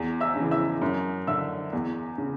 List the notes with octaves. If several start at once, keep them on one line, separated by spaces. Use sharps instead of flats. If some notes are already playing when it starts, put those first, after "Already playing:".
Already playing: E2
E5 E6
C#3 E3
E5 E6
F#2
D3 E5 E6
E2
C#3